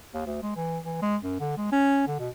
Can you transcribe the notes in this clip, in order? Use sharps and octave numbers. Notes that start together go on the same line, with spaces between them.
D#2
D2
G#3
E3
E3
G#3
F#2
D3
G#3
C#4
D3
B2